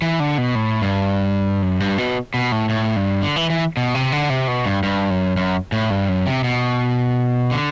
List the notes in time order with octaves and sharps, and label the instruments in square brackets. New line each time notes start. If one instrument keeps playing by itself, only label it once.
[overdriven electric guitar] E3
D3
B2
A2
G2
F#2
G2
B2
B2
A2
A2
G2
D3
E3
E3
B2
C3
D3
C3
B2
G2
G2
F#2
F#2
A2
G2
F#2
C3
B2
D3